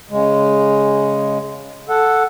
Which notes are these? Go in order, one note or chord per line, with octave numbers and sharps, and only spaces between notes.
C#3 G#3
A4 F#5